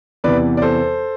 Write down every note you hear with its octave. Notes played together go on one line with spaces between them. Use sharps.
E2 C3 E3 B4 D5
D5
A4 C5